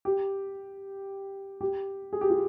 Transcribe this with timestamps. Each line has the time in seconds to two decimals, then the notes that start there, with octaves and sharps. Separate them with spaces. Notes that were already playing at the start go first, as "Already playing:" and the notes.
0.05 G4
1.61 G4
2.13 G#4
2.21 G4
2.30 F4